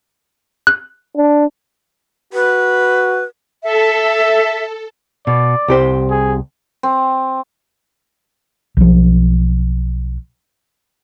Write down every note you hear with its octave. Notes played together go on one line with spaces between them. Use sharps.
F#6
D4
F#4 B4
A4 E5
B2 D5
C2 G4 C5
G#4
C4
B1 F3